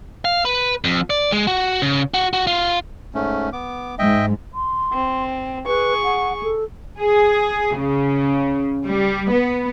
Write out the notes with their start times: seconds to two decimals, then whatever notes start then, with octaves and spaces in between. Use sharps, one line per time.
0.25 F5
0.45 B4
0.84 F2
1.10 D5
1.32 G#3
1.47 F#4
1.82 C#3
2.14 F#4
2.33 F#4
2.47 F4
3.14 G#2 A3 C#4
3.53 B3 D6
3.99 G#2 D#5 E5 G5
4.54 C6
4.93 C4
5.66 G#4 B4 C#6
6.04 F#5
6.43 A4
7.00 G#4
7.76 C#3
8.85 G3
9.31 B3